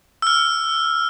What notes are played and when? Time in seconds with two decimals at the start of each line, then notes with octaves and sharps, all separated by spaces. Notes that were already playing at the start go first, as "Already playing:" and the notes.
0.22 E6 F6